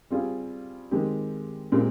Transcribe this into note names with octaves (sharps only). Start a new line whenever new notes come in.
G3 C4 F4 G#4
D#3 G#3 C4 G4
A#2 G#3 C4 G4 A#4